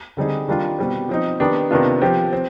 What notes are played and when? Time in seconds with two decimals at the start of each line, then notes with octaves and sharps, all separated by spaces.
0.17 D3 G3 C4 D#4 G#4
0.48 D#3 G3 D4 F4
0.79 B2 G3 C4
1.09 F3 C4 D#4
1.40 D#3 B3 D4 G4
1.71 C3 D#3 B3 D4 F4
2.01 F3 C4 G4
2.33 C4